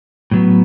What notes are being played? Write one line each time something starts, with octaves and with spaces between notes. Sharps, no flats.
A2 F#3 B3